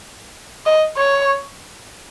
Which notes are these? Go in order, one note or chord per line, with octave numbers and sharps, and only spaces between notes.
D#5
C#5